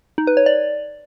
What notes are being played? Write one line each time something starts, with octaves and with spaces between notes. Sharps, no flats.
D#4
B4
C#5
D5